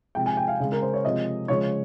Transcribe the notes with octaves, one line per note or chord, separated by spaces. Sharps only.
C3 F3 G#3 G5
G#5
G5
F5
C#3 G#3
A#4
C5
C#5
C3 F3 G#3 D#5
C#3 F3 G#3 C#5